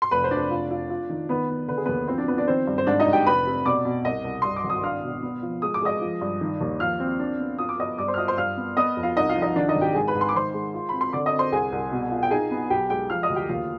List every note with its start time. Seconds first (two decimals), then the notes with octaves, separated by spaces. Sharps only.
0.02 C6
0.11 F1 B4 B5
0.24 C5
0.31 F1 D4 D5
0.51 F4
0.71 F4
0.90 F4
1.10 D#3
1.29 D#3 B3 B4
1.49 B3
1.68 D3 B4
1.78 G#4
1.85 D#2 B3 B4
2.08 F3 C4 C5
2.18 D4 D5
2.27 F3 B3 B4
2.38 D4 D5
2.47 D#3 C4 C5
2.67 G2
2.78 C5
2.87 G#2 D4 D5
3.00 D#4 D#5
3.07 G#2
3.13 G4 G5
3.26 F1 B4 B5
3.46 C3
3.65 B2 D5 D6
3.85 B2
4.04 C2 D#5 D#6
4.24 C2
4.42 G2 C6
4.56 D6
4.64 G#1
4.70 D#6
4.83 D4 F5 F6
5.03 B2
5.23 B3
5.43 F3
5.62 G#3 D#6
5.74 D6
5.82 G#3 D#5 D#6
6.01 F3
6.21 G2
6.41 D#3
6.61 D#2
6.80 F3 F5 F6
7.00 C4
7.20 D4
7.40 B3
7.58 F4 D#6
7.69 D6
7.79 B3 D#5 D#6
7.98 G2 D5 D6
8.08 C5 C6
8.14 F6
8.18 F4 D#5 D#6
8.28 C5 C6
8.38 G2 F5 F6
8.57 B3
8.77 B3 D#5 D#6
8.97 F2
9.03 F4 F5
9.16 C2 D#4 D#5
9.29 F4 F5
9.36 F3
9.42 D#4 D#5
9.56 D#3 D4 D5
9.68 D#4 D#5
9.75 G#1
9.81 G4 G5
9.95 G#2 G#4 G#5
10.08 B4 B5
10.15 G#2
10.21 C6
10.29 D6
10.34 D#3 C5 C6
10.54 G#3
10.74 F4
10.89 C4 B5
11.01 C6
11.13 D3 D5 D6
11.26 D#5 D#6
11.33 C4
11.39 C5 C6
11.52 C2 G#4 G#5
11.72 C2
11.92 B2
12.11 F4
12.23 G5
12.31 D#4 G#4 G#5
12.51 B3
12.70 B1 G4 G5
12.90 G#3 G4 G5
13.10 F3 F5 F6
13.23 D#5 D#6
13.30 D2
13.36 G4 G5
13.49 D#2 F4 F5